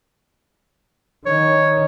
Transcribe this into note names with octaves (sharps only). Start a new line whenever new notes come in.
D#3 C#5